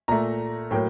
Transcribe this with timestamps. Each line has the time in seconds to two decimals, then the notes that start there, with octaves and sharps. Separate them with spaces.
0.08 A#2 A3 A#5
0.71 A2 F#3 A#3 G5